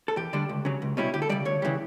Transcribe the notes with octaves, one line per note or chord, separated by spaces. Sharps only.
A4
E2 G4
D3 G3 D4
C#2
C#3 F#3
C#2
B2 G3 C#4 E4
D2 G4
A4
C#3 G3 D5
D2 C#5
C#3 E3 G3